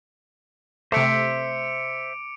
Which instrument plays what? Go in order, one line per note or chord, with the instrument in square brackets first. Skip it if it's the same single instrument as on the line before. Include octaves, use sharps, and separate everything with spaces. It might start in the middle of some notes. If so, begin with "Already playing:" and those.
[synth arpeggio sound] C3 A3 [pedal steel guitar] C5 E5 [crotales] D6 C#7 D7